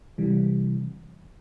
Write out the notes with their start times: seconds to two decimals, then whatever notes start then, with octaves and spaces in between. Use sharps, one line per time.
0.18 C3 E3 G3